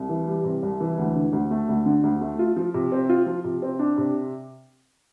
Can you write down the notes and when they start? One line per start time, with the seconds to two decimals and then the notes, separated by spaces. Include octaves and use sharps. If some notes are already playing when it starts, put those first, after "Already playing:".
Already playing: C2
0.09 E3
0.27 G3
0.45 C3
0.63 C2
0.80 E3
0.98 D2
1.15 D3
1.32 D2
1.51 A3
1.68 D2
1.86 D3
2.03 D2
2.21 A3
2.39 F4
2.56 F3
2.74 C3
2.92 C4
3.09 F4
3.26 F3
3.44 C3
3.62 C4
3.79 D4
3.98 C3